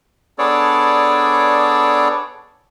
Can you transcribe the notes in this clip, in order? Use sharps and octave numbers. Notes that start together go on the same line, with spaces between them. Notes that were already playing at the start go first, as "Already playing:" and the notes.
B3 D4 G#4 A4 C#5 D5